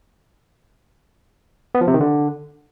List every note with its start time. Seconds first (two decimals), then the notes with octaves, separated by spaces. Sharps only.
1.75 B3
1.81 F3
1.88 C3
1.94 D#3
2.00 D3